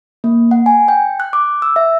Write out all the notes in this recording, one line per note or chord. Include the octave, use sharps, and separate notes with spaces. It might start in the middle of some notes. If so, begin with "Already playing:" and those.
A#3
F#5
G#5
G5
F#6
D6
E6
E5